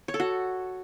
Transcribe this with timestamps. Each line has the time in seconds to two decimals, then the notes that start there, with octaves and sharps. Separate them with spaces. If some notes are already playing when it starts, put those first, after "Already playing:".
0.08 C#5
0.14 A4
0.20 F#4